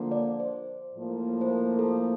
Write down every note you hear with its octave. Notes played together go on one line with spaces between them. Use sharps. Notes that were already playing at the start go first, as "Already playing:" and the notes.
Already playing: D3 F3 A#3
D5
C5
A2 F3 A#3
C5
A#4
A4